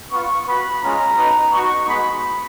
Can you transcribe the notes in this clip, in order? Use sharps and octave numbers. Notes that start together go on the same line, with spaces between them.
B3 F4 C#6
B3 F#4 B5
G#3 C#4 F4 A#5
B3 D#4 F#4
B3 D#4 F#4 C#6
G#3 B3 D#4 F#4 B5